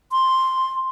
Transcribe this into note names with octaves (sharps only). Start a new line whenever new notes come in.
C6